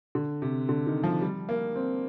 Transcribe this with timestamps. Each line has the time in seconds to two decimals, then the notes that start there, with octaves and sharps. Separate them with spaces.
0.15 D3
0.42 C3
0.69 D3
0.87 D#3
1.04 F3
1.22 G3
1.49 A#3
1.75 C4